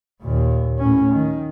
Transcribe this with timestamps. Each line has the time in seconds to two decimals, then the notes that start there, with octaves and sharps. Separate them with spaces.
0.22 D#2 A#2
0.79 A2 C#4
1.12 D#3